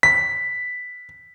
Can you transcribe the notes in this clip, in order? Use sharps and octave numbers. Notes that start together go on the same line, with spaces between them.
B6